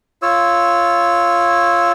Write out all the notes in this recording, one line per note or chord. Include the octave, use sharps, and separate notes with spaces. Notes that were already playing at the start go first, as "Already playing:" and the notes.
F4 C#5 E6